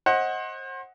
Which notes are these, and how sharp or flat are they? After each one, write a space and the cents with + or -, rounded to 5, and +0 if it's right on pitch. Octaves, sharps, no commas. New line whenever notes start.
C5 +35 D#5 +20 F#5 +0